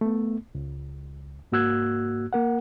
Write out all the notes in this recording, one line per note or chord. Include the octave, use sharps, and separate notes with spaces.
A3 B3
C#2
G#2 A#3 F#4 E6 F#6 G#6
A#3 A#4 F#5